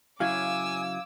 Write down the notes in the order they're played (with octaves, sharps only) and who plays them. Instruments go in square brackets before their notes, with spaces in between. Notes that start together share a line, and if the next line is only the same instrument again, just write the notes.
[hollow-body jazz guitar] C#3 F#3 E4 [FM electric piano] F5 G#6 [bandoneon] G#5 [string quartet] D6 E6